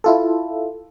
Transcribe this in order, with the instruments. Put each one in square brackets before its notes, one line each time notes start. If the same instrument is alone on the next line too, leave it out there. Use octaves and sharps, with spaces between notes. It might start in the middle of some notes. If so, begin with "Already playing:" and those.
[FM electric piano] E4 F4 A4